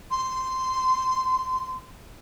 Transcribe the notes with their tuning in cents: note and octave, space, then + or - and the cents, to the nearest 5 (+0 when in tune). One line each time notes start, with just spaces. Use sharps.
C6 -10